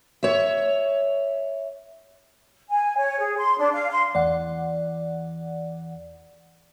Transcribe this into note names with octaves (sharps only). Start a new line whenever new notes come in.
C#5 E5
G#5
C#5
G#4
C6
D4
F5
C6
E2 D5 F#5